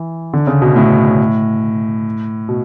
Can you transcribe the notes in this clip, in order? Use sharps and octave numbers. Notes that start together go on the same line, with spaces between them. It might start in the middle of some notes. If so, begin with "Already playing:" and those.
Already playing: E3
D3
C#3
B2
A2
B2